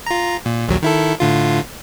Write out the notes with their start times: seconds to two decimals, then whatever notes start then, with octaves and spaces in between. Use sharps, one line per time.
0.07 F4 A#5
0.46 A#2
0.68 A#1 D#2 F#3
0.82 D#3 E4 A4
1.20 A2 D3 F4